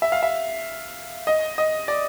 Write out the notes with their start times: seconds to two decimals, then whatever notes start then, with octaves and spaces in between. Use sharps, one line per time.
0.02 E5
0.12 F5
0.23 E5
1.27 D#5
1.58 D#5
1.88 D5